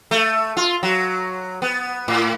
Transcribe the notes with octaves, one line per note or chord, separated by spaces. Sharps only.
A3
F4
F#3
B3
A2